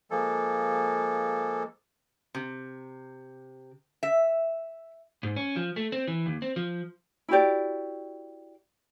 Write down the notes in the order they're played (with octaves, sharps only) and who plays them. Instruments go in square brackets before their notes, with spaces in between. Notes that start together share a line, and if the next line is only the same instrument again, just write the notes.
[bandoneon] F3 G#3 A#3 A4
[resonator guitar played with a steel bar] C3
E5
[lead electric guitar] G#2
C#4
F3
A3
C4
E3
D#2
C4
F3
[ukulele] E4 F#4 G4 D5